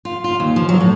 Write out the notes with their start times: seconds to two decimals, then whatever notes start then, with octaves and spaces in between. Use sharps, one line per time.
0.05 F4
0.24 F4
0.40 D#2
0.56 F3
0.69 F#3
0.81 A2